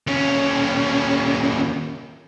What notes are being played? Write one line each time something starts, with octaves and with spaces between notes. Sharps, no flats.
D#2 C#4